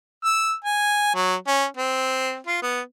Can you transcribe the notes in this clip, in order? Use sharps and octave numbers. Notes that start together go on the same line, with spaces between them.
E6
G#5
F#3
C#4
C4
F4
B3